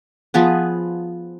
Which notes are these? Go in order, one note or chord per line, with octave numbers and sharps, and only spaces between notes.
F3 B3 G#4 B4